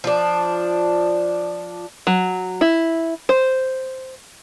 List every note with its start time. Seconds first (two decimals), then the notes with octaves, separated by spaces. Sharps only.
0.04 F3 D4
2.07 F#3
2.61 E4
3.29 C5